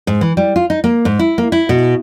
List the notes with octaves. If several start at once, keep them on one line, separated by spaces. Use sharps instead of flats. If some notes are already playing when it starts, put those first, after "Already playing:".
G#2
E3
G3
F4
D#4
A#3
G#2
E4
A#3
E4
B2